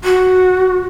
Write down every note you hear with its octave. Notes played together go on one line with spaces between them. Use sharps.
F#4